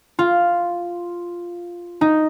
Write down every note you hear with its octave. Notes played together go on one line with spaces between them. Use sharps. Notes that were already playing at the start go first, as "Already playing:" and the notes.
F4
D#4